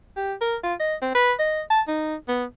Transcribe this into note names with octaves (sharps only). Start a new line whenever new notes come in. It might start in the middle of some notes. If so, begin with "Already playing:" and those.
G4
A#4
F4
D#5
C4
B4
D#5
A5
D#4
B3